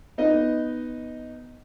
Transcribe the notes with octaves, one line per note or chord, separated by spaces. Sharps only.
B3 D#4 D#5